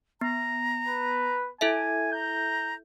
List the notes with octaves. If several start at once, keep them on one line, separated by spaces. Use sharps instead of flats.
B3 A#5
B4
E4 A4 E5 G#5
A#5 G6